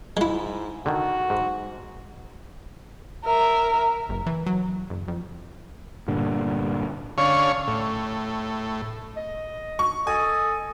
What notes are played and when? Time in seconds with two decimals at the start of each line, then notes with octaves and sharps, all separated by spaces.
0.17 G#2 G#3 E4
0.86 D3 D#3 F#4
1.30 G#2
3.25 A#4 E5
4.09 F#1
4.26 E3
4.46 F#3
4.90 F#1
5.08 F2
6.08 G2 A#2 D3
7.18 D3 C#4 C#5 F5
7.67 A2
9.17 D#5
9.79 C#6
10.07 A4 D#5 G#5